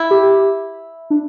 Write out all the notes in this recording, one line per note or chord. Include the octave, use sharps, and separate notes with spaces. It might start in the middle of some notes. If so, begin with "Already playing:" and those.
Already playing: E4
G4
D4